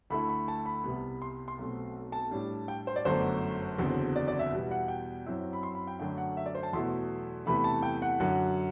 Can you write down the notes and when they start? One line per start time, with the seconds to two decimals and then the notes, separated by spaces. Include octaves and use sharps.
0.10 D2 D3 A3 E4 B5
0.29 B5
0.48 A5
0.66 B5
0.84 C2 C3 G3 B3
1.22 C6
1.48 C6
1.58 B1 B2 A3 C4
2.12 A5
2.31 A2 G3 D4
2.68 G5
2.87 C5
2.96 D5
3.05 G1 F#2 D3 A3 D4 C5
3.78 F#1 E2 D3 F#3 C4
4.16 D5
4.28 D5
4.39 E5
4.52 E2 B2 G3
4.71 F#5
4.88 G5
5.26 F#2 F#3 C4 E4
5.53 B5
5.63 C6
5.75 B5
5.87 G5
6.00 F#2 D3 A3 D4 G5
6.18 F#5
6.37 E5
6.46 D5
6.55 C5
6.63 A5
6.73 E2 B2 F#3 A3 E4 C6
7.46 E2 C3 E3 A3 B5
7.64 A5
7.83 G5
8.02 F#5
8.19 F#2 D3 F#3 F#5